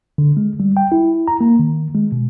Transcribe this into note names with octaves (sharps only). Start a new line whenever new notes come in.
D3
G#3
G3
G5
E4
A#5
A#3
D#3
G#3
B2